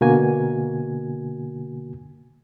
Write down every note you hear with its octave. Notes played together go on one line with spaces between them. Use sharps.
B2 D3 A#3 F#4 G#5